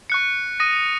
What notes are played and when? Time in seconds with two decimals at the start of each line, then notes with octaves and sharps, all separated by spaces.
0.10 C#6 F#6 C#7
0.60 D#6 A#6 D#7